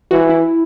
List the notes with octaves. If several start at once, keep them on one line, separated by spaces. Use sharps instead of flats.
E3 F#4
E4